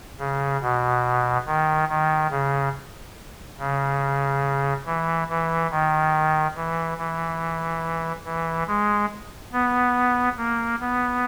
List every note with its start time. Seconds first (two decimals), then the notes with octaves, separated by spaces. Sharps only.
0.19 C#3
0.61 B2
1.46 D#3
1.89 D#3
2.31 C#3
3.59 C#3
4.86 E3
5.29 E3
5.71 D#3
6.56 E3
6.98 E3
8.25 E3
8.67 G#3
9.52 B3
10.37 A#3
10.80 B3